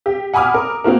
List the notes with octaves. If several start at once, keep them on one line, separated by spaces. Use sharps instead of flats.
G4
F#5 G#5 B5 D6 D#6 F6
A#4
A#3 C4 F4 F#4 A#4